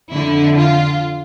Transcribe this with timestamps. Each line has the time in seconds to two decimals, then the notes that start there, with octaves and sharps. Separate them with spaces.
0.10 F2 D3 E4
0.56 F4